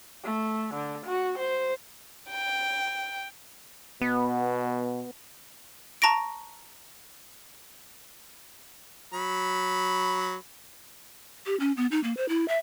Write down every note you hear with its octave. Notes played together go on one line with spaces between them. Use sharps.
A3
D3
F#4
C5
G5
B2 B3
A5 A#5 C#6 A#6 D7
F#3 B5
G4
C#4
B3
D#4
A#3
C5
E4
E5